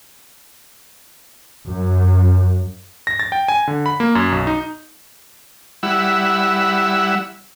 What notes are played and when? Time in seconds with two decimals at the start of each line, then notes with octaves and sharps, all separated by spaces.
1.65 F#2
3.07 A#6
3.19 A6
3.32 G5
3.48 G#5
3.68 D3
3.86 B5
4.00 A#3
4.15 F#2
4.32 B1
4.47 D#4
5.83 G3 E4 F#5 B5 E6